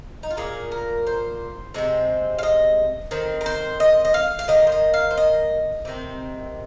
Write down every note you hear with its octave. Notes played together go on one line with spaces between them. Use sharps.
D#4
F4
A#2 A#3 G#4
A#4
C5
C3 G#3 C4
F5
D#5
D#3 C4
A#4
C5
D#5
D#5
F5
F5
D#3 A#3 D#5
C5
D#5
F5
C5
D#5
C3 D#3 C4